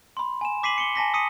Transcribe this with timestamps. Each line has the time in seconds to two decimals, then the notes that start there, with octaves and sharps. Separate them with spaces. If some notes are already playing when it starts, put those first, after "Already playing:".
0.17 B5 C6
0.41 G#5 E7
0.63 D6 B6 C7 D#7 F#7
0.78 C#7 G7
0.95 G#5 A5 A#6 B6
1.14 D#6 B6 C#7 D#7